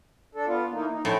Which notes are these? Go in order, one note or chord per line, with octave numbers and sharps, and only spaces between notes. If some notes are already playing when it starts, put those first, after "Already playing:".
D4 A4
B3 F4
E3 A#3 D#4
D#4
A2 C#4 E4 C5